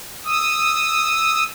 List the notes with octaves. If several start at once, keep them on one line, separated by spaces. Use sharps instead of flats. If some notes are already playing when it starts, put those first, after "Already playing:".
D#6 E6